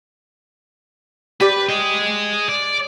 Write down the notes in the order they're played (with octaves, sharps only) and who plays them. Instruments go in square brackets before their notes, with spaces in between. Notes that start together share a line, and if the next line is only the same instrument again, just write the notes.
[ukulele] G4 D5 [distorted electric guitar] B4
[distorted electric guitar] G#4 D#5
D5